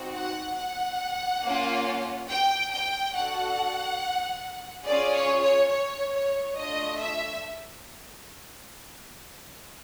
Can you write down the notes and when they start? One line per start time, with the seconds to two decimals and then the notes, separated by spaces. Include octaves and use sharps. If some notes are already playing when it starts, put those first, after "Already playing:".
Already playing: C4 D#4 F#4
0.14 F#5
0.57 F#5
1.43 A#3 C#4 F4
2.29 G5
2.72 G5
3.14 D4 F#4 A4 F#5
4.86 C#4 F4 G#4 D5
5.14 C#5
5.43 C#5
5.71 C#5
6.14 C#5
6.57 A3 D4 F4 D#5
7.00 E5